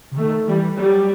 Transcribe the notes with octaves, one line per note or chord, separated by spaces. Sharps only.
C3
D#3 A3
E3 G3
F#3 G3